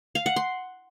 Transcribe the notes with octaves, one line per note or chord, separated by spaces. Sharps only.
F5
F#5
C6